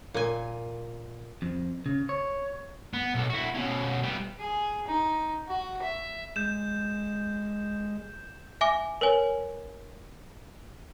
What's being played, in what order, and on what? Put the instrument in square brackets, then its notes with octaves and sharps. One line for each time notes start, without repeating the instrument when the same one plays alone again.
[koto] A#2 G#5 [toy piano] F4 A#4
[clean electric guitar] F2
C#3
C#5
[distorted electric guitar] B3
B1 A4
E4 F#4
B2 C#4
G3 B3
[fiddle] G#4
D#4
F#4
E5
[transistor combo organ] G#3 [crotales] G6 E7
[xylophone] E5 G#5 D6
A#4 B4 C#5 G#5